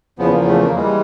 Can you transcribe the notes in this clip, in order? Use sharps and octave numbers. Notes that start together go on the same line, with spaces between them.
E2 C#3 F3 B3
A#3
A3
A#3
E3 G3 G#3